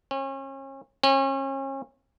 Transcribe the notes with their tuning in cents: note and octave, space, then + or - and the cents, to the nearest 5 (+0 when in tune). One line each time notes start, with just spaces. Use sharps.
C#4 -35
C#4 -35